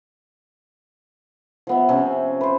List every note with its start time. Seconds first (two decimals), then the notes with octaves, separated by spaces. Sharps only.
1.67 F3 B3 E5
1.89 C3 C#4
2.41 B4 C5